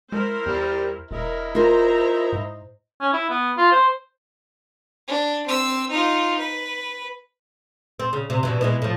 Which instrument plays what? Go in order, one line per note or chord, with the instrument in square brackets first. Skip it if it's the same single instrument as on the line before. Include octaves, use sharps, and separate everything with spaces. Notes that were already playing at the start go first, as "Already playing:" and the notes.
[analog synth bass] G#3 [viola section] E4 A#4 C5
[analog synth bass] E2 [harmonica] G3
[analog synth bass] E1 [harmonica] E4 D#5 [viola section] A#4
[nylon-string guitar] F4 A#4 [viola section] C5 A#5
[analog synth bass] G#2
[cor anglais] C#4
E4
B3
F4
C5
[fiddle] D4
C4 E6
D#4 F4
B4
[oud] C4
C#3
C3
G2 B2 E3
B2 E3 G#3
A2 F3